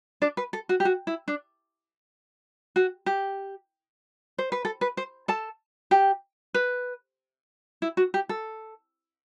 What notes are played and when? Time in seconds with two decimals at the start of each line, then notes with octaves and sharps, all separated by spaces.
0.22 D4 D5
0.37 B4
0.53 A4
0.69 F#4
0.80 G4
0.85 F#4
1.07 E4
1.28 D4
2.76 F#4
3.06 G4
4.38 C5
4.52 B4
4.65 A4
4.81 B4
4.97 C5
5.28 A4 A5
5.91 G4 G5
6.54 B4
7.82 E4
7.97 F#4
8.14 G4
8.29 A4